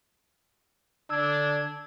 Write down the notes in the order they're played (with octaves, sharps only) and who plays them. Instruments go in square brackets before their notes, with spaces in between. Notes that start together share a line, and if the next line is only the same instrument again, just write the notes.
[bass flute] D3 [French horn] D4 [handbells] E6 [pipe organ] G#6